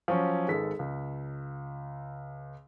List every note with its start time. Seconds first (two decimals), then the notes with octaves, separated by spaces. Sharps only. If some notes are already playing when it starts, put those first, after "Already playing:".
0.08 F3 F#3 C#4
0.48 G#1 G#3 D#4 A4 B4 B6
0.79 C#2